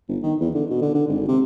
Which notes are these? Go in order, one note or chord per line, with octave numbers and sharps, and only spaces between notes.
G1
D#3
E2
D3
B2
D3
D3
G#1
C3